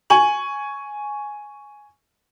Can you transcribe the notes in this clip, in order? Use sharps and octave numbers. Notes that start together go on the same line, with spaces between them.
G#5 C#6 F#7